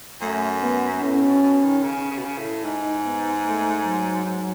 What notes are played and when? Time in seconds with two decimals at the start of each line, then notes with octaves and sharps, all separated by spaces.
0.21 F#2 A3
0.63 B3
1.02 A2 C#4
1.23 B2
1.43 B2
1.63 D#3
1.83 C#3
2.10 C#3
2.18 B2
2.25 C#3
2.37 A2
2.64 G#2 D#4
3.05 B3
3.46 A3
3.85 F#3
4.26 G#2